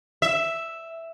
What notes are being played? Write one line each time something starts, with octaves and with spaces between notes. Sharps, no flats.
E5